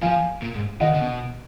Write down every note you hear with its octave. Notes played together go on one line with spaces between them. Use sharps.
F3 F5 G#5
A#2
G#2
D#3 D#5 F#5
D3
B2